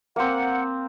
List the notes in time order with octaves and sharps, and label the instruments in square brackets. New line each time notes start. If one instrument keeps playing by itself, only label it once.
[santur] A#3 C4 [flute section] F#5